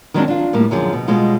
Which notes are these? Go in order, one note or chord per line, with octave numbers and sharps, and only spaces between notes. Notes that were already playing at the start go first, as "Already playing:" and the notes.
D#3 F3 F#3 G#3 C4 D4
D4 F4
A2 G3 A#3
F#2 D3 F3 G#4
B2
B2 G3 G#3 F4